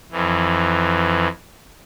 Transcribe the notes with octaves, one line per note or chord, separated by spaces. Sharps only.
F2 E3